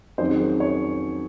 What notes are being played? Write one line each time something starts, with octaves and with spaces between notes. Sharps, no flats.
F2 D#3 F#3 C#4 C5
G#4
A#4
C#5